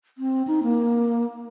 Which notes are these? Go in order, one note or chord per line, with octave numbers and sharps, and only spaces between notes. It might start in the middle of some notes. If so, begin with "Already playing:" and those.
C4
D#4
A#3